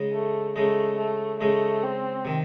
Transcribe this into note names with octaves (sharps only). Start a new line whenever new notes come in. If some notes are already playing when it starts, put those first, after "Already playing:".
Already playing: C#3 G#3 D#4
A3
C#3 G#3 A3 D#4
A3
C#3 G#3 A3 D#4
C4
C3 D#3